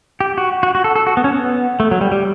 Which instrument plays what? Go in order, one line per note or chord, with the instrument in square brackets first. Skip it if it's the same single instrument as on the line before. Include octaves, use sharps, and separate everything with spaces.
[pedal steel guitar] G4
F#4
F#4
F#4
A4
A4
F#4
B3
C#4
B3
A3
F#3
G3
G3